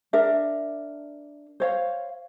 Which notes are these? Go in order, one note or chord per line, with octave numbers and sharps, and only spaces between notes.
D4 A#4 E5
C5 C#5 F5